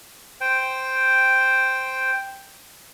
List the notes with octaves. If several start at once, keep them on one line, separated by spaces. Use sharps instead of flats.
C5 G5